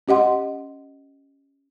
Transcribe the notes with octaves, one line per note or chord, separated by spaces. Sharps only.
C#4 G4 D#5 F#5 C6